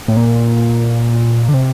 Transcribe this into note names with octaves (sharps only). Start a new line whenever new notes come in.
A2
A#2
D3
C3